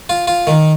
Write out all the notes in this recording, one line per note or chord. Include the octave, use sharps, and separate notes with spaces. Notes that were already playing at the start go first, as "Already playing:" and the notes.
F4
F4
D#3